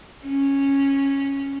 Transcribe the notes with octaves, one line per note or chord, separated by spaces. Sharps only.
C#4